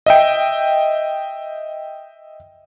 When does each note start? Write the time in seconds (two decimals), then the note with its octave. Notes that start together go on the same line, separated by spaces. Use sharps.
0.06 D#5 E5 G5